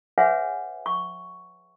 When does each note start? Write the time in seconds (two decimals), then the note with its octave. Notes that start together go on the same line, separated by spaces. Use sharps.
0.18 G#4 B4 C#5 E5 F#5 G#5
0.86 C#6